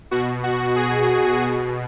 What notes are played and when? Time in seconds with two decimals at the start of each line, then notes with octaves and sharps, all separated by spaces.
0.11 B2 F#4
0.43 F#4
0.76 G#4
1.41 B2